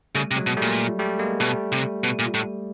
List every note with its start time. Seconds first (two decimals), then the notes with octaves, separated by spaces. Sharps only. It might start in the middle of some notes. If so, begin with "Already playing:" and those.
0.15 C#3 G3 A3
0.31 C3
0.36 F#3 G#3
0.47 B2
0.57 G3 A3
0.62 A#2
0.99 G3 A3
1.19 G#3 A#3
1.40 B2 G3 A3
1.72 C3
2.03 B2
2.19 A#2
2.34 A2